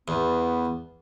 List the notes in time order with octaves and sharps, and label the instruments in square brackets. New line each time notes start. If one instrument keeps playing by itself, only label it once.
[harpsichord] E2 [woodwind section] B3